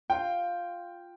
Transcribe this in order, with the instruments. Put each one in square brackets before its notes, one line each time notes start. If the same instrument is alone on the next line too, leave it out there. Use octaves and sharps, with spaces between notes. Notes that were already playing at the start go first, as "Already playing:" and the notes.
[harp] F4 [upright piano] G5